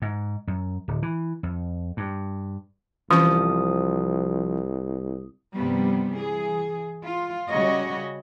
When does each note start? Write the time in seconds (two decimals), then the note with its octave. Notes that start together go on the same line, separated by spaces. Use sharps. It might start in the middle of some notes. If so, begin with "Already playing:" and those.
0.02 G#2
0.47 F#2
0.88 D1
1.03 E3
1.43 F2
1.97 G2
3.11 C2 E3 F3 C#4 C#6 D#6
5.55 G2 C3 F3 G3 B3
6.13 E3 G#4
7.03 F4
7.48 C#3 G3 F#4 C#5 D#5